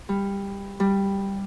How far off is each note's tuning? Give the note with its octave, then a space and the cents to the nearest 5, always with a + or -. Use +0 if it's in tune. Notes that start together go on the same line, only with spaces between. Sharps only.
G3 +15
G3 +5